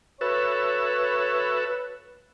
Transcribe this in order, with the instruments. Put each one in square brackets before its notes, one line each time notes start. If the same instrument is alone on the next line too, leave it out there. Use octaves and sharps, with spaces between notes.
[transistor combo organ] F#4 A4 E5 [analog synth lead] B4 [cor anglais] C#5